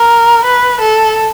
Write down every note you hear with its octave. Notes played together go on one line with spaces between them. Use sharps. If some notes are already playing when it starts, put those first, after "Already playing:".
Already playing: A#4
B4
A4